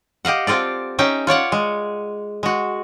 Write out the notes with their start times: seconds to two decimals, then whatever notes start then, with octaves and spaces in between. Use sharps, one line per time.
0.25 G4 D#5 F5 F#5
0.47 C4 F4 A4 D5
0.99 C#4 D#4 E5 G5
1.27 F4 C#5 D5 F#5
1.52 G#3
2.43 G#3 F#4